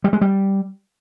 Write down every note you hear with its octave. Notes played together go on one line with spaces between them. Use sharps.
G3
G#3
G3